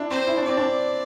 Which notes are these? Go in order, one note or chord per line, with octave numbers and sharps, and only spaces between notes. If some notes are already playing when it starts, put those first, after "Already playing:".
Already playing: D4 E4
C4 C5
E4
D4
C4 D5
D4